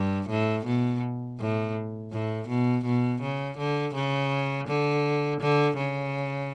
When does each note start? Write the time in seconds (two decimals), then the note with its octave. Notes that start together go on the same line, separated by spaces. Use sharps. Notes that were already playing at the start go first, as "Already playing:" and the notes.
Already playing: G2
0.30 A2
0.66 B2
1.39 A2
2.12 A2
2.48 B2
2.85 B2
3.22 C#3
3.58 D3
3.95 C#3
4.68 D3
5.41 D3
5.77 C#3